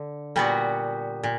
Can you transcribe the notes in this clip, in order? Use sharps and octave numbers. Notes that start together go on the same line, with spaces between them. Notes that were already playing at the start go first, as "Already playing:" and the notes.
Already playing: D3
A#2 G3 B3 F#4
A#2